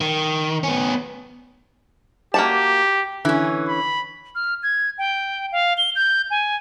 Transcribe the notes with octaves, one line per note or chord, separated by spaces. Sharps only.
D#3
B3 C#4
A#3 F#4 G4 A5
D3 E3 C#4
B5
F6
G#6
G5
F5
G7
G6
G#5